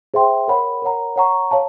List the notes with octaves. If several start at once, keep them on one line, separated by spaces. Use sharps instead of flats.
G#4 C5 E5 G5 C6
A#4 C#5 F#5 B5
A#4 C#5 F#5 A#5
C#5 F#5 A#5 C#6
C#5 F5 A5